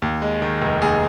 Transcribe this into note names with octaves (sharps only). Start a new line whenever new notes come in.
D#2
G#3
D#3
F1
D#2 G#4